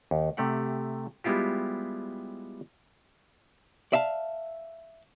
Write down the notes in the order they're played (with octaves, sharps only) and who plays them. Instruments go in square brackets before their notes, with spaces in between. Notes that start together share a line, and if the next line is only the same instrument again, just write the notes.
[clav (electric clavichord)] D#2
C3 A3 G4 F#5
G3 G#3 B3 E4 F4 G4
[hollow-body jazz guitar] D5 E5 F5 A5